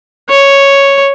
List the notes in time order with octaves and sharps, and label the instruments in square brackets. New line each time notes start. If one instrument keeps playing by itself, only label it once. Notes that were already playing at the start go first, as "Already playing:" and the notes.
[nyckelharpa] C#5